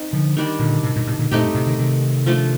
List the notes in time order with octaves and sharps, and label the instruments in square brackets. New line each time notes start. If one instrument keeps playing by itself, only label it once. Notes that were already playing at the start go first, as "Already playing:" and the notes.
Already playing: [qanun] C4 D#4
[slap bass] D3 F3
[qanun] D#3 G3 D4
[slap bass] A#2 D3
A2 C3
G2 A#2
A2 C3
A#2 D3
[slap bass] G2 A#2 [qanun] A3 C4 D#4 G4
[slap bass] G2
A2 C3
C3 D#3
C3 D#3
[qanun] F3 A3 D4 F4